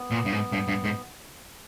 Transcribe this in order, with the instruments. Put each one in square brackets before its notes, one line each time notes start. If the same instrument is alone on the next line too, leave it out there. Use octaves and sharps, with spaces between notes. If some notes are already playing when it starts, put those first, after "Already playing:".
Already playing: [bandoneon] B3
[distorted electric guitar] A#2
G2
G#2
G2
G2
G#2